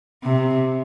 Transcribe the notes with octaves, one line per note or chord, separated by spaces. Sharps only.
C3